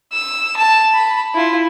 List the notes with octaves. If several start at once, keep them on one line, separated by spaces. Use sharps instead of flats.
E6
A5
B5
E4 F4